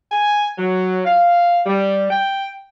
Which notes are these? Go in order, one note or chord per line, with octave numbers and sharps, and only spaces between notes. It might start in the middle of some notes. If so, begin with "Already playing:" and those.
G#5
F#3
F5
G3
G5